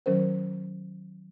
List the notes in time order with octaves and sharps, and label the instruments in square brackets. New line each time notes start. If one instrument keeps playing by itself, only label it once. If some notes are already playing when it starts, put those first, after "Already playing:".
[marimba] D#3 F#3 C#4 A#4 C5